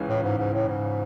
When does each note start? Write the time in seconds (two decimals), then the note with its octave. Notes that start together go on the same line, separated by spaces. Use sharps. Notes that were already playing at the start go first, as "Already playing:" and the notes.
Already playing: C#2 C#3 E3 G#3 C#4
0.09 A2
0.23 G#2
0.38 G#2
0.54 A2
0.68 G#2